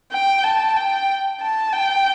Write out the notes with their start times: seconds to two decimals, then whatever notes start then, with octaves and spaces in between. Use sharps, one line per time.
0.12 G5
0.44 A5
0.76 G5
1.40 A5
1.72 G5